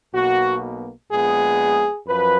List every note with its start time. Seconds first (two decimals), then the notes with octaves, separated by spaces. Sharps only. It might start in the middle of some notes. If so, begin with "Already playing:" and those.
0.13 B1 B2 A#3 F#4
1.10 A#1 A#2 G#3 B3 G#4
2.07 F#2 F3 B4